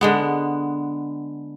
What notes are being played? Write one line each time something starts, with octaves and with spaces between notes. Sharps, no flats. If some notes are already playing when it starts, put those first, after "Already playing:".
D3 G#3 B3